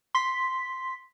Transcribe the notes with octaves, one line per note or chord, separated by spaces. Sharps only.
C6 B6